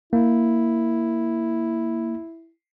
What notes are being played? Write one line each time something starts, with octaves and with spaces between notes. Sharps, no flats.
A#3 E4